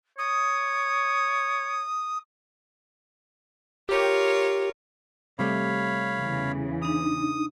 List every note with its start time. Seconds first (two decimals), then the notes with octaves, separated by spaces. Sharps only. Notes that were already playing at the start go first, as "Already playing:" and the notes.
0.18 C#5 D#6
3.89 F4 G4 A#4 C#5
5.39 C3 G3 A3 C#5 F5 B5
6.18 E2 C#3 E3
6.82 D4 D#4 D#6